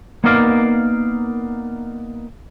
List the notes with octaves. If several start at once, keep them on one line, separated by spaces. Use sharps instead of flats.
A#3 B3 D#4 A#4 D5 F5